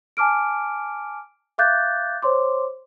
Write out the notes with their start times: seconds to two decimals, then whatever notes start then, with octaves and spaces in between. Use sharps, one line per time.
0.17 G#5 A5 D6 F6 D7
1.58 E5 F5 D6 F#6 G6 A6
2.22 C5 C#5 C6 D6